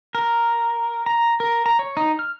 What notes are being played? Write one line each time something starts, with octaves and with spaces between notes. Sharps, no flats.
A#4
A#5
A#4
A#5
C#5
D#4
F6